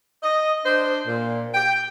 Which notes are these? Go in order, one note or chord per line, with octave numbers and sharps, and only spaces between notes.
D#5
D4 C5
A#2
G5